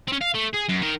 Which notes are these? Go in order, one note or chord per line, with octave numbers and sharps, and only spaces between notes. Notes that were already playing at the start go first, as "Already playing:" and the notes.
C4 C#4
F5
A3
G#4
F#2
D#3 A#4